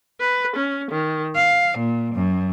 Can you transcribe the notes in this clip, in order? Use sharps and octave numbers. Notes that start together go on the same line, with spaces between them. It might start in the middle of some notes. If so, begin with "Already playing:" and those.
B4
C#4
D#3
F5
A#2
F#2